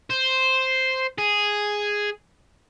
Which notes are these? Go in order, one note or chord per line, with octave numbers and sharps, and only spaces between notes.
C5
G#4